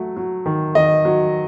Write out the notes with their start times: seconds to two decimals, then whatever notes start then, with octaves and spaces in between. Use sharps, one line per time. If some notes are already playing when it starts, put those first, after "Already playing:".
Already playing: F#3 A3
0.17 F#3
0.46 D#3
0.75 D#3 D#5
1.05 F#3